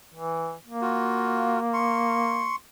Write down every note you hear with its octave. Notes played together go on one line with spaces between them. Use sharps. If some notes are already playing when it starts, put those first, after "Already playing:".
E3
A#3
F4 F#4
C6 C#6